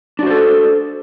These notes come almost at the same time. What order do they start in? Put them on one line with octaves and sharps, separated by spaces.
D4 F#4 C5 A4